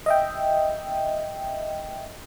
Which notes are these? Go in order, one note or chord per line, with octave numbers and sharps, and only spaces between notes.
D#5 E5 G5